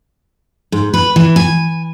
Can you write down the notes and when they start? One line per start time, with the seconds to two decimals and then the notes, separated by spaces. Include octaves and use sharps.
0.72 G#2
0.94 B4
1.16 E3
1.36 G#5